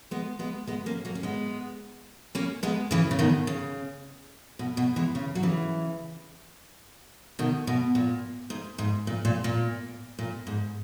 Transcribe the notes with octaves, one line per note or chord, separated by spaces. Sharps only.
G#3 B3
G#3 B3
G#3 B3
A#3 C#4
F#3 A#3
C#4
G#3 B3
A#3 C#4
G#3 B3
C#3 E3
C#3
B2 D#3
C#3
B2
B2
E3 G#3
C#3
F#3
C#3 E3
B2 D#3
B2
A#2
G#2
G#2
A#2
A#2
A#2
A#2
G#2